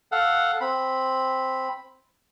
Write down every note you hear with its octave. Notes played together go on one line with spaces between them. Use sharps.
A4 F5 F#5
C4 B5